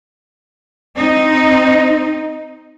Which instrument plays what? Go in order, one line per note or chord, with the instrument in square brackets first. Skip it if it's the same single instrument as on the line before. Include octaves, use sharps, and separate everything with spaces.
[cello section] C4 D#4